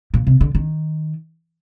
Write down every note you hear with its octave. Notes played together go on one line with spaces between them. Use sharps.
A#2
C3
D3
D#3